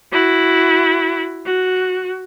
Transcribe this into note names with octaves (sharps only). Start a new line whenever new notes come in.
E4 F#4
F#4